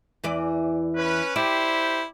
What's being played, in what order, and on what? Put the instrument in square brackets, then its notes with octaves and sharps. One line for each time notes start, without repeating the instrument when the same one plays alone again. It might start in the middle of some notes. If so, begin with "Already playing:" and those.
[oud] E2 E3 D5
[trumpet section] C#4 B4
[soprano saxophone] E4 [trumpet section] G4 C5 [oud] D5